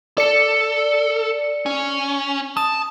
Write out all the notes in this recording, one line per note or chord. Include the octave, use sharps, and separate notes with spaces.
A4 D5 C#7
C#4
A5 D#6